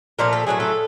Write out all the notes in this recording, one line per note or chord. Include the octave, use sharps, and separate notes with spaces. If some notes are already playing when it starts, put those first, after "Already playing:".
A#2 F3 A3 A#4
A4
A2 F#3 A3 G#4
A4